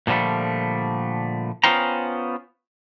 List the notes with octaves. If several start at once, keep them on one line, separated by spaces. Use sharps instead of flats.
A#2 D3 F3 G3 A3
B3 C#4 F4 C5 G5 A#5